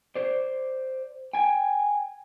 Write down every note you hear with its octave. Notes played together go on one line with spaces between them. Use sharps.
C5 D5
G5 G#5